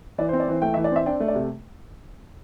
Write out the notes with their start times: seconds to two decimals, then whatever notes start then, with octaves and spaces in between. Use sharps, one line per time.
0.18 E3 D5
0.29 C5
0.33 C4
0.40 D5
0.48 E3 C5
0.62 A3 G5
0.74 E3 E5
0.84 D5
0.92 C4 E5
1.06 D4 G5
1.20 A3
1.28 D5
1.35 C3